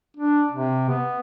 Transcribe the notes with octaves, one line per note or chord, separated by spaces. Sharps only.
D4
C3
B3